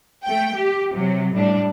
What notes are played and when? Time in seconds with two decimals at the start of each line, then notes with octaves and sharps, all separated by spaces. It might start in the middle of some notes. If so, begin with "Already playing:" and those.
0.25 A3 G5
0.56 G4
0.92 C3 F#3
1.34 A2 G3 D4